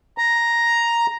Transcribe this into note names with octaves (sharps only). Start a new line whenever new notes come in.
A#5